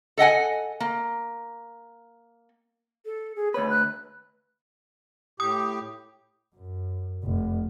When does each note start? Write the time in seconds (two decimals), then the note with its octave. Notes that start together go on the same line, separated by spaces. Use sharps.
0.18 A4 D#5 F#5 G#5
0.80 A#3
3.05 A4
3.36 G#4
3.54 D2 B4 C#5
3.70 F#6
5.40 A2 G4 D#6
6.56 F#2
7.23 F1